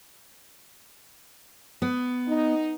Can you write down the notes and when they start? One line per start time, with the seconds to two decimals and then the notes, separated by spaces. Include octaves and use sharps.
1.82 B3
2.27 D#4